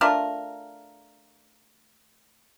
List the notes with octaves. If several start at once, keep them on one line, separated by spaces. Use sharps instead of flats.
A3 D4 F4 A#4